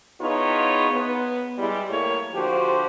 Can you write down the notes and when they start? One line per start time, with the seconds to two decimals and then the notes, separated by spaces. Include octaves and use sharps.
0.21 E3 B3 D#4 F4 G#4 C#5
0.91 B3
1.58 G3 G#3 E4
1.90 A2 A#3 C#5
2.33 D3 F3 F#4 G4 C5